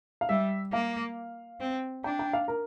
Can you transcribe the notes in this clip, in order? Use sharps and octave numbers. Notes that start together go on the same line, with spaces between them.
F5
G3 E5
A#3 F5
C4
D4 G5
G5
F5
A#4